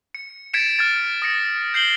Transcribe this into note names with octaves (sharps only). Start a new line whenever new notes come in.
C#7
G#6 A6 B6 C#7 D7 E7
F6 G#6 A6 E7
D#6 A#6 C#7
G6 C7 F#7 G7